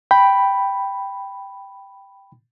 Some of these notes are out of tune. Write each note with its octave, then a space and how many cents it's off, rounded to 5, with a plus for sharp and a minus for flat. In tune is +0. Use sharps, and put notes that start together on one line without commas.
G5 +0 B5 +0